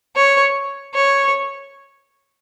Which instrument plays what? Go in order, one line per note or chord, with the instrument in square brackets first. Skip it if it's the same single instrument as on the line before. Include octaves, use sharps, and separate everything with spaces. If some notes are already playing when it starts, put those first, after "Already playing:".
[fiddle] C#5
C#5